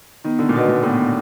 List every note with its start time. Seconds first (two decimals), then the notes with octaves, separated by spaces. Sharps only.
0.24 D#3 B3
0.39 D3
0.49 A#2
0.54 B2 D4 F#4 B4 D#5
0.68 A#2
0.83 A2 B3